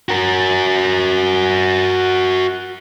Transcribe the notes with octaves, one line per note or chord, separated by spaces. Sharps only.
F#4 A#4